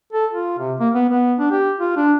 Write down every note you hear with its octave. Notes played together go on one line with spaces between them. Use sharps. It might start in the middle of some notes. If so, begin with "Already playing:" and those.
A4
F4
C3
A#3
B3
B3
D4
G4
F4
D4